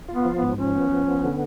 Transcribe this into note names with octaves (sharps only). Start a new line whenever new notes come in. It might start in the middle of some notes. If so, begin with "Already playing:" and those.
F4
B3
F3
B3
G#2
F3 C#4
B3
F3
B3
D3